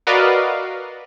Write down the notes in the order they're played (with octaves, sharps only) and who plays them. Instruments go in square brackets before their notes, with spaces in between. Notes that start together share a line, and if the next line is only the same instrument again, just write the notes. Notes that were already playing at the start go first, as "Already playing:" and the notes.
[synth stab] F#4 A#4 B4 D5 D#5 F5